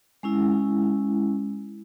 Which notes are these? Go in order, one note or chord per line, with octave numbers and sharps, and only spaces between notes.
G#3 C#4 E4